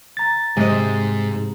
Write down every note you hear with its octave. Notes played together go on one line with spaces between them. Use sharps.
A#5 A6
G#2 C3 G#3 D#5